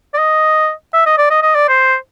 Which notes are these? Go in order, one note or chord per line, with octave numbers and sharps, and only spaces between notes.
D5
D#5
E5
D#5
D5
D#5
D#5
D5
C5